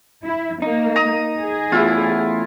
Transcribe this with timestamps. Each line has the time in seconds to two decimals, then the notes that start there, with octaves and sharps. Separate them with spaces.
0.24 E4
0.62 A#3 D#4
0.96 A#5 D#6
1.39 G#4
1.72 E2 A2 E4 F4